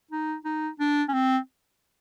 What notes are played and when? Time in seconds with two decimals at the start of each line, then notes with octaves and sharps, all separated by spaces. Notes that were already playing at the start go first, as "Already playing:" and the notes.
0.11 D#4
0.45 D#4
0.79 D4
1.08 C#4
1.14 C4